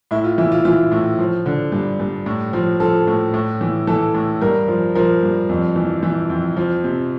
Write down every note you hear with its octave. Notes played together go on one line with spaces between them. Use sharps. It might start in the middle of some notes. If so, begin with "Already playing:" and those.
A2 E4
F4
E3 E4
F4
E3 F4
A2
F3
D3
G2
G2
A2
F3
F3 A4
A2
A2
E3
E3 A4
A2
G2 A#4
F3
F3 A#4
G2
F2
E3
E3
F2
F3
C3